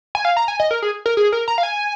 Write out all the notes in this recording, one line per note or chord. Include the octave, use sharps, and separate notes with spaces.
G#5
F5
A#5
G#5
D#5
A#4
G#4
A#4
G#4
A#4
A#5
F5
G#5